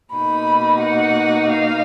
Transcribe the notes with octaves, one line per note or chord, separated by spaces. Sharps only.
B2 A#3 D#4 B5
F#5
F5